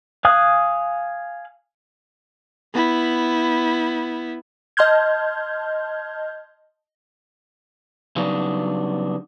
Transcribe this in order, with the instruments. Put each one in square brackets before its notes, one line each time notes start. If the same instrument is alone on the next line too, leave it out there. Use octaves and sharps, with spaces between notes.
[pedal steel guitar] F5 G#5 D#6 F#6
[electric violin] B3 E4
[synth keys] D#5 A5 C6 F6 G6 G#6
[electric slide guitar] C#3 F#3 G3 B3 D4 D#4